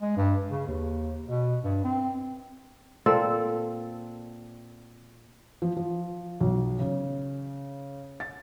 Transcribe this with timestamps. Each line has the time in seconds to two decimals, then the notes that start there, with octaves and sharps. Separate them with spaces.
0.02 G#3
0.16 G2
0.50 C#3
0.67 D#2
1.27 B2
1.64 G2
1.84 C4
3.06 A#2 C4 A4
5.62 F3
5.77 F3
6.40 B1
6.79 C#3
8.20 A6